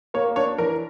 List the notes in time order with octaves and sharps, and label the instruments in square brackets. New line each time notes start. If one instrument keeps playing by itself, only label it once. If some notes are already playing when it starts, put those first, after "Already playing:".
[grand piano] A#3 [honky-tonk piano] C#5
[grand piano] D4 [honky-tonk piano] C#5
[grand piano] E3 [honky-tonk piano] A#4